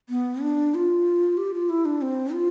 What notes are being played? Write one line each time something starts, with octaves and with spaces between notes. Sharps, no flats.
B3
D4
F4
G4
F4
E4
D4
C4
F4